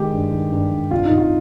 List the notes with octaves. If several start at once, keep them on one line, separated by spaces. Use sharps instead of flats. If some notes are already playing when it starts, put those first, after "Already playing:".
Already playing: D#3 G#3 G4
G2
D#3
G2
G2
C2 F4
D#4
C2
F4